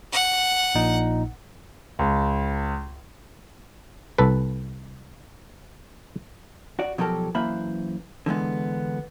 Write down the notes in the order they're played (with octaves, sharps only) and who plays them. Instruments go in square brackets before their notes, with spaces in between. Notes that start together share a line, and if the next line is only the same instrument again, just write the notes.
[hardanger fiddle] F#5
[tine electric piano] A#1 A#2 D#4
[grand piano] C#2
[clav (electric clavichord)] C2 A4 B4
[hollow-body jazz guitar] F#4 D5
B2 F3 F#3 G4 A4 A#4
F#2 E3 A#3 C5 E5 B5
D3 E3 G#3 B3